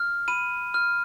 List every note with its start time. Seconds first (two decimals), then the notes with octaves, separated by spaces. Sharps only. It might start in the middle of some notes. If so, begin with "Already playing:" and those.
Already playing: F6
0.28 B5 D#7
0.74 F6